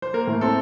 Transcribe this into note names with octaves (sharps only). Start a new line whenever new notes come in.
C5
A#3 A#4
A2
C4 A4